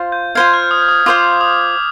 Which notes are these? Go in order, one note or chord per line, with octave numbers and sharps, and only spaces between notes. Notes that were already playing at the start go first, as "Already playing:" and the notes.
Already playing: F4 C5 F5
G6
F4 C5 F5 G#6
F6
D#6
F6
D#6
F4 C5 F5 D6
D#6